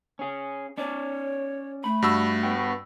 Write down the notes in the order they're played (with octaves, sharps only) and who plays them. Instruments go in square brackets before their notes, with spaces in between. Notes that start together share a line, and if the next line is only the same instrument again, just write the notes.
[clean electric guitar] C#4 G#4
[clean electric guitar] C#4 D5 [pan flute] C#5
[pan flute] A3 [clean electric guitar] B5
[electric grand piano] G2 F#4 E6
[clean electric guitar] B3 G5